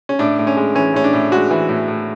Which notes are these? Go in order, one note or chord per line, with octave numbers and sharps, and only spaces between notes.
C#4
A2 D4
A2
C#4
G#3
E3 C#4
A2 C#4
D4
A2
G#3 F#4
E3
A2
A2